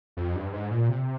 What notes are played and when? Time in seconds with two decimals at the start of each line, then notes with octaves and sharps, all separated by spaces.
0.17 F2
0.35 G2
0.53 G#2
0.71 A#2
0.89 C3